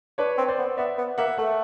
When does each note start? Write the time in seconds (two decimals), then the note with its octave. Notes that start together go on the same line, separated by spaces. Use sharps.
0.18 D4 B4 C#5
0.38 C4
0.48 C5 D5
0.58 B3
0.77 B3 D5 E5
0.98 B3
1.18 A#3 E5 F#5
1.38 A3 E5 F#5